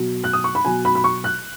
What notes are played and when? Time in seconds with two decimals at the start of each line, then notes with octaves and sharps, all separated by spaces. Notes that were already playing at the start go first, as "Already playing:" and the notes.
Already playing: B2 F#3
0.24 F#6
0.33 D#6
0.44 C#6
0.55 B5
0.65 B2 F#3 G#5
0.85 B5
0.95 B5
1.04 C#6
1.24 F#6